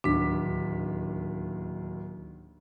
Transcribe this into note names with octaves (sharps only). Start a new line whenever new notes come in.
D1 D#2 D4 B6